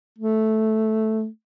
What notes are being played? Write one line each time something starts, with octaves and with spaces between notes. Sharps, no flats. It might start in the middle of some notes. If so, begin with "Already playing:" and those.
A3